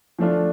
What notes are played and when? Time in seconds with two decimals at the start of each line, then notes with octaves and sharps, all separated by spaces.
0.19 F3 A3 D4 F4